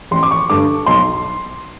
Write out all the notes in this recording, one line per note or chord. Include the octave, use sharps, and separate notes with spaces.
A1 C6
D6
C#6
G2 D3 D6
B1 C6